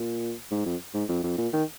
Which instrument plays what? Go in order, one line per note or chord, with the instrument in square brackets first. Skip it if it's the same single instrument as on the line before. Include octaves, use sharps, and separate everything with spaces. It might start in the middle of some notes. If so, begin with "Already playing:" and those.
Already playing: [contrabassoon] A#2
G#2
F2
G#2
F2
F2
A#2
D#3